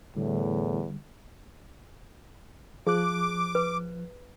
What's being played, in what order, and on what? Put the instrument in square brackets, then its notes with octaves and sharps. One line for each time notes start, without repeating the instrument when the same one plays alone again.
[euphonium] E2 [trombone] A2 [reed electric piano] D3 G3
[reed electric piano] F3 F#6 [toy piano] G#4 [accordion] D6
[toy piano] B4